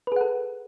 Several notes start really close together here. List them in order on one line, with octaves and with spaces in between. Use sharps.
B4 G#4 F#5 A4